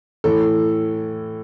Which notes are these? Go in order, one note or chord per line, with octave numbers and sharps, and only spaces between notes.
A2 E3 A4